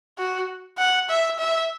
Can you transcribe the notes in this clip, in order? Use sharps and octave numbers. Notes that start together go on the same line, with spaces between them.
F#4
F#5
E5
E5